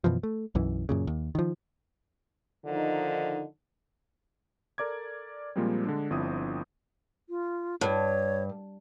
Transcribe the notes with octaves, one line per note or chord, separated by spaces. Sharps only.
F#2 B2 E3 F3
A3
B1 F#2 E3
F#2 A#2 C#3
D#2
D#3 F3
D3 D#3 F3 D#4
A4 A#4 D5 D6 G#6
A#2 F3 G3 G#3 A#3 C4
D3 G#3 D4
G1 F3 C4 D4 E4 D#6
F4
G2 C#5